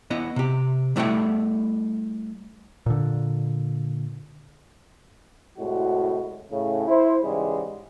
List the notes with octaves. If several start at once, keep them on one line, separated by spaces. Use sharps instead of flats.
B3 E4 D#5
C3 G4
G3 A3 E4 D5 F#5 G5
A#2 D3
C2 A2 G#3 F#4
A2 C#3
E4 C5
G#2 C#3 E3 G3 G#3